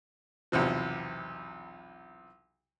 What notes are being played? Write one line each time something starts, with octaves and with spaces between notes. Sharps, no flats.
B1 E2 C3 F3